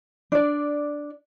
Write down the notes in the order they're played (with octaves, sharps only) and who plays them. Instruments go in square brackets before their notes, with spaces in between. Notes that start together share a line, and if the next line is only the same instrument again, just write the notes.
[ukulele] D4 D5